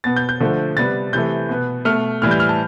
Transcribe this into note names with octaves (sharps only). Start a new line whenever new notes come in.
B2 B3 A6
G6
G6
D3 F3 A3
C3 G3 B3 A6
C3 E3 A3 G6
B2 B3
B2 A3 F6
A2 E3 G3 F6
G6
F6
A5